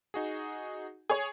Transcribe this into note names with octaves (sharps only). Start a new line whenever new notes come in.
D#4 F#4 G#4
G#4 C#5